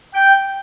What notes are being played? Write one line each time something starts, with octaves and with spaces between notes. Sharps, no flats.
G5